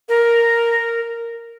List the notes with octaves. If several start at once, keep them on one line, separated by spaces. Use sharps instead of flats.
A#4